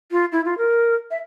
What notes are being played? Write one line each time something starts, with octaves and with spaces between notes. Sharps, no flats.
F4
E4
F4
A#4
E5